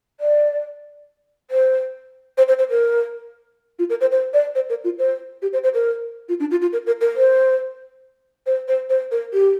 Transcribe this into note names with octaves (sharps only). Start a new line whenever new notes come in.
D5
C5
C5
C5
C5
A#4
F4
A#4
C5
C5
D5
C5
A#4
F4
C5
G4
C5
C5
A#4
F4
D4
F4
F4
A#4
A#4
A#4
C5
C5
C5
C5
A#4
G4